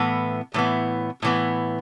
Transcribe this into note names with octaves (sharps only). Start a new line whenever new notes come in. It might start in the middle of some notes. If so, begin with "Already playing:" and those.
Already playing: A2 E3 B3
A2 E3 B3
A2 E3 B3